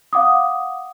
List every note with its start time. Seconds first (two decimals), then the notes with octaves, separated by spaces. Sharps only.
0.13 F5 F#5 D6 D#6